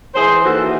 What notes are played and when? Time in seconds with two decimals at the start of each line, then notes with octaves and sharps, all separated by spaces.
0.15 E3 G#4 C5
0.44 D#2 F#4 A4